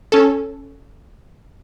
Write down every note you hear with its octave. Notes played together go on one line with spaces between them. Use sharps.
C#4 A4